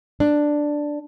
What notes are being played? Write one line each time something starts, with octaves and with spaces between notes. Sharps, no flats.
D4